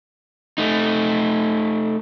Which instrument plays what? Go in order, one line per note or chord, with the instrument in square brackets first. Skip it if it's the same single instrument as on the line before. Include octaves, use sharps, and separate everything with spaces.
[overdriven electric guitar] A3 D#4